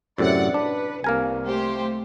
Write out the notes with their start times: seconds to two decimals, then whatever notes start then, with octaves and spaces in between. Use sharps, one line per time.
0.18 F#2 A2 C3 D5 F#5
0.54 D4 B4
1.04 C2 A#3 A#4 G#5
1.46 A3 G4 C5